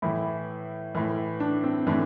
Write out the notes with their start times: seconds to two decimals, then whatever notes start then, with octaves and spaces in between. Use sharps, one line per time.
0.02 A2 E3 E4
0.95 A2 E3
1.40 D4
1.64 C4
1.87 A2 E3 D4